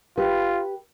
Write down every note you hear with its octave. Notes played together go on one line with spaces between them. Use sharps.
F4 G4 B4